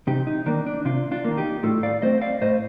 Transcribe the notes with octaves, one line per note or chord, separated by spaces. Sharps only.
C3 D#4 G4
D#4
D#3 A#3 D4
D4
C3 D4 F4
D4 F4
D#3 A#3
D#4 G4
A2 F4 A4
D5 F5
A3 C4 C5 D#5
D5 F5
A2 C5 D#5